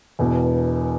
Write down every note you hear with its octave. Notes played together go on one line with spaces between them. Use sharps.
E1 E2 B2